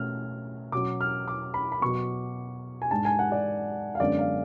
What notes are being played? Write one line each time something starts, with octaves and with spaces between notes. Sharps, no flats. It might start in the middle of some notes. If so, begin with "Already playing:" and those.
Already playing: B2 A3 C#4 F6
B2 F#3 C#4 D6
F6
D6
B5
B5
B2 F#3 B3 C#6
G#5
G#2 G#3 D4 A5
G#5
F#5
D5
F5
F#2 D3 G#3 B3 D4 D5
F5